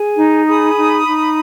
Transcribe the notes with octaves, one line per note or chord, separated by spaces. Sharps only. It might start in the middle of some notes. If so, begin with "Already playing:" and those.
Already playing: G#4
D#4
G#4 B5 D#6
D#4
D#4